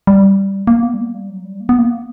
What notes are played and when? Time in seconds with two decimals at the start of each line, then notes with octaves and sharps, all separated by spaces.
0.07 G3
0.67 A#3
0.83 B3
0.94 G3
0.99 A#3
1.15 G3
1.29 F#3
1.44 G3
1.60 A#3
1.69 B3
1.78 A#3
1.91 B3